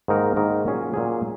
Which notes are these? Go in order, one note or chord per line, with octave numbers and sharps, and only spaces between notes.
G#2 D#3 A#3 D#4 A#4
G#2 D#3 A#3 D#4 A#4
A#2 F#3 C#4 G#4
A#2 F#3 C#4 G#4